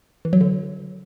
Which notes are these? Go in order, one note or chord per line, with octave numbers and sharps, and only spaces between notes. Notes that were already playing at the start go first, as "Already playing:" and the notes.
E3
F#3
D3